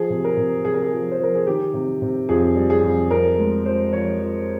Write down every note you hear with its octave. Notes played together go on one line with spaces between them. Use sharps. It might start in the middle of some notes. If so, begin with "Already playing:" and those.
Already playing: F3 G#4
C3
A#4
C3
C3 G#4
A#4
G#4
F3
C5
F3 A#4
G#4
D#3 G4
C3
C3
F2 G#4
G3
G#4
F2
F2 A#4
G#3
F3 C5
F3 C#5
F3